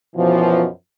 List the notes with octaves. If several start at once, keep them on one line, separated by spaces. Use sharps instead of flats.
F#2 B2 E3 F3